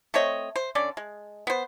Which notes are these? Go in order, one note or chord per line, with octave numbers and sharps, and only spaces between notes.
A3 C4 C#5 D#5
C5
D3 C#4 D5
G#3
B3 C5